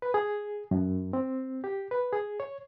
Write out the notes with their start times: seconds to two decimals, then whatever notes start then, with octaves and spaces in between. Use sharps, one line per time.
0.02 B4
0.14 G#4
0.71 F#2
1.13 C4
1.64 G4
1.91 B4
2.13 G#4
2.40 C#5